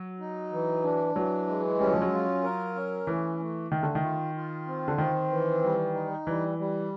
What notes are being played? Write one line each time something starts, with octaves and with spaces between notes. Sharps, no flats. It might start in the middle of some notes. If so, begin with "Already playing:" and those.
Already playing: F#3
D#4
E3
D4
E3 F#3
G#3
G3 C#4
F#3
F3
F#3
F4
A#4
C#4
E3 A3
A3
D#3 A3
D3
D#3
F4
F4
C4
D3
D#3 C4
E3
G3
D#4
E3 G3
G3